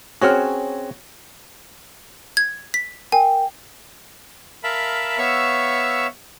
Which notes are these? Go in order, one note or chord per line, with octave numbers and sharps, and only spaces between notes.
C4 C#4 F#4 G#4 C#5 F6
G#6
B6
A#4 G5 G#5
A#4 E5 F5 A5 B5
B3 C#5 E5 F5 C#6 E6